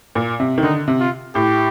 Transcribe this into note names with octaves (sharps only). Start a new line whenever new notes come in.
A#2
C3
D#3
D3 D#4
C3
F4
A2 G4